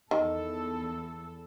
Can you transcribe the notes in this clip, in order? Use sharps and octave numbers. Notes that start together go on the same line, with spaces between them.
E2 D#3 A4